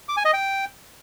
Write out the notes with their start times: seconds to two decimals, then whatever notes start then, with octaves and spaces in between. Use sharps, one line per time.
0.09 D6
0.17 G#5
0.25 D#5
0.33 G5